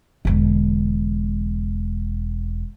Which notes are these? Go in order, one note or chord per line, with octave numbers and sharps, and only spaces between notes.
E1 D3